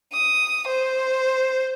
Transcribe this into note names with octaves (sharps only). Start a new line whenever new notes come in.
D#6
C5